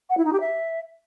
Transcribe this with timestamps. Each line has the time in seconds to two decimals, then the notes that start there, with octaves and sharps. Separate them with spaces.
0.09 F#5
0.17 E4
0.25 D#4
0.33 G4
0.40 E5